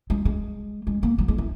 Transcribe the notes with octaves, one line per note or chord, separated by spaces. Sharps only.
G#3
G#3
G#3
A#3
F#3
G#3
E3